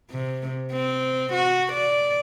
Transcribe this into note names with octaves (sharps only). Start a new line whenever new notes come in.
C3
C4
F#4
D5